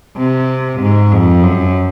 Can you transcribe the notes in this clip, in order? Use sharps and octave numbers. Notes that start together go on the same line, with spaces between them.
C3
G#2
F2
F#2